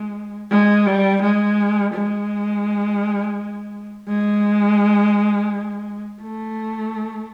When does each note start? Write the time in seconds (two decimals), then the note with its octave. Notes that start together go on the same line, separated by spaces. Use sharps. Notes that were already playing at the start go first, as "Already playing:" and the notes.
Already playing: G#3
0.51 G#3
0.86 G3
1.22 G#3
1.94 G#3
4.08 G#3
6.22 A3